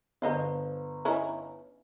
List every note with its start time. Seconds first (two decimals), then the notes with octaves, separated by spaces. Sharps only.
0.22 G1 C5 D#5 F5
1.05 C#4 D#4 E4